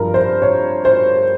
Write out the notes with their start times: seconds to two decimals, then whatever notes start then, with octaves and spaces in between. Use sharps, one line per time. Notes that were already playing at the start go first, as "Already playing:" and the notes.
Already playing: G2 F3 A#4
0.14 C5
0.42 C#5
0.85 C5